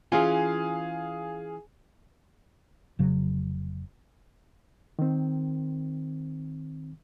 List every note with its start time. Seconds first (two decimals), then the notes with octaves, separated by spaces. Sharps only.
0.12 E3 C#4 F4 G#4 F5 G#5
2.99 F1 C#3 F#3
4.99 D#3 C4